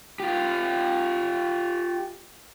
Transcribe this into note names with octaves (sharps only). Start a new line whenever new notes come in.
F4 G4